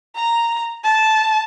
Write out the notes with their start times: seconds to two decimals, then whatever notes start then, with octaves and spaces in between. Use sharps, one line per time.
0.16 A#5
0.84 A5